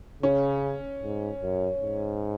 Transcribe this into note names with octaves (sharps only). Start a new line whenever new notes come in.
C#3 C#4
G#2
F#2
G#2